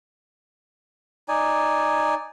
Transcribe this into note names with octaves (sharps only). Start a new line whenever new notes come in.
D#4 D5 G#5